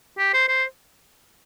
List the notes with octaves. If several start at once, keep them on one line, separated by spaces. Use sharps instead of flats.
G4
C5
C5